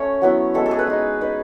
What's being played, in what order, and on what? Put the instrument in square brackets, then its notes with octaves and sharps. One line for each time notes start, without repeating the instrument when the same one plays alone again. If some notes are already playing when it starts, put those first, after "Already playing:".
Already playing: [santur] A3 C#4 C#5
F#3 B3 E4
G#3 B3 E4 A4
A4
G#4
B4
G#3 D#4
G#3 D#4 B4